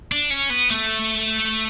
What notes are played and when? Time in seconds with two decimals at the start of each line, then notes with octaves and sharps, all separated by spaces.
0.12 D4
0.31 C#4
0.50 B3
0.70 A3